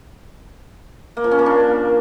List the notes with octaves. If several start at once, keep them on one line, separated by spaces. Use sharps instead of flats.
A#3
F3
C#4
A#3
D4